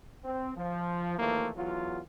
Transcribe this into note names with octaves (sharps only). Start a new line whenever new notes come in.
C4
F3
D#2 E3 F3 A3 A#3
E2 F#3 F4